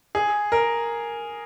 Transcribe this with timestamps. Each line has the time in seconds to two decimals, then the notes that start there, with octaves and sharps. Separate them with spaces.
0.15 G#4
0.52 A#4